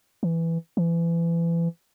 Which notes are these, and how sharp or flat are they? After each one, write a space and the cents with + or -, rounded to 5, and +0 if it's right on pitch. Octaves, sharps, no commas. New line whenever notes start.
E3 +5
E3 +30